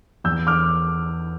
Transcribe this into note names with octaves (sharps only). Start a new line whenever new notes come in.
E2 E6 G6
D6 F6